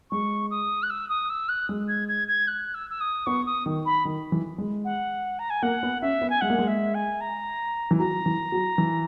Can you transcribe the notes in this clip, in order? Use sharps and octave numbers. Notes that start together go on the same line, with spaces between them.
G#3 C#6
D#6
F#6
E6
D#6
E6
F#6
G#3
G#6
G#6
G#6
F#6
E6
E6
D#6
B3 C#6
D#6
D#3
B5
D#3
E3
G#3
F#5
A#5
G#5
A#3 F#5
B3
C#4 E5
B3
G#5
G#3 F#5
A#3
G#3
E5
G#5
A#5
E3
F#3 A#5
E3
F#3
E3